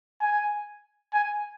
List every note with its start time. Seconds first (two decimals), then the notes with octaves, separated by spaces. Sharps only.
0.21 G#5
1.13 G#5